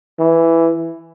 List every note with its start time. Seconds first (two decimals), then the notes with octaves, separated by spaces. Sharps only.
0.19 E3